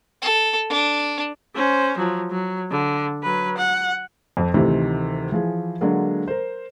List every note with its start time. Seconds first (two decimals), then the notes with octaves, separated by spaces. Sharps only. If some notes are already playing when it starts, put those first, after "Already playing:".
0.22 A4
0.69 D4
1.55 C#4 C5
1.98 F3 F#3
2.31 F#3
2.71 D3
3.23 F#3 B4
3.57 F#5
4.37 F2 C4
4.54 D2 C3 D#3 E3
5.32 E3 F3 G#4
5.81 D3 F#3 G#3 A#3
6.28 A#4 C5